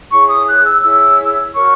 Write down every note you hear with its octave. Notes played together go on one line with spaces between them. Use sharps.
E4 G#4 C#5 C#6
D#6
F#6
E6
E4 G#4 C#5 E6
F#4 A#4 C#5 C#6